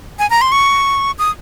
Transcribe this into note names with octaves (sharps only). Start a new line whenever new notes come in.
G#5
A#5
C6
C#6
D#6